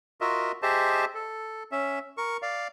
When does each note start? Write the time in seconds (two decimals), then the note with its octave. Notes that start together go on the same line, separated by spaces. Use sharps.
0.21 F4 F#4 A#4 D#5 E5
0.62 G4 G#4 C5 D#5 E5 A5
1.15 A4
1.72 C#4 E5
2.17 A#4 C#6
2.42 D5 F5